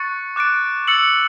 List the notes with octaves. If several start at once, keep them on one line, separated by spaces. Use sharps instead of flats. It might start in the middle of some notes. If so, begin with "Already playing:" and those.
Already playing: C#6 F#6 A6 C#7
D6 F#6 A6 D7
E6 A6 C#7 F#7